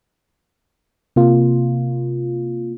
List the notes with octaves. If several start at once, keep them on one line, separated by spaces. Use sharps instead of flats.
C3 A#3 F4